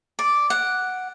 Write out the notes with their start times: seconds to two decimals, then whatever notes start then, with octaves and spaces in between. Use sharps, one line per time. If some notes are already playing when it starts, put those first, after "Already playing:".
0.19 D5
0.50 F#5